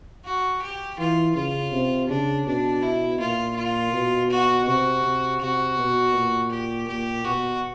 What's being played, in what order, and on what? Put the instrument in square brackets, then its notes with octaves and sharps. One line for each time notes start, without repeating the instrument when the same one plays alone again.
[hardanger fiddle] F#4
G4
[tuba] E3 [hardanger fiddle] F4
[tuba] C#3 [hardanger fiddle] F4
[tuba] C3
[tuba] C#3 [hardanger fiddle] D4
[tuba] B2 [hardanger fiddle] D4
[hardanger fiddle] E4
[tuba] A#2 [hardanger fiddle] F4
[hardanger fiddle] F4
[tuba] B2
[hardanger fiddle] F#4
[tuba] C3 [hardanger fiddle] F#4
[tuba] C3
[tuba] C3 [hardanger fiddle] F#4
[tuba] B2
A#2
[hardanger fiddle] G4
[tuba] A#2 [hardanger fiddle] G4
[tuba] B2 [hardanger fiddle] F#4